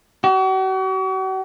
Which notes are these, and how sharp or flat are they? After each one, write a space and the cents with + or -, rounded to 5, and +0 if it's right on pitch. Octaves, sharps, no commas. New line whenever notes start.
F#4 +40